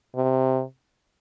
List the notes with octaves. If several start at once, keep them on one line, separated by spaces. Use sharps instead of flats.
C3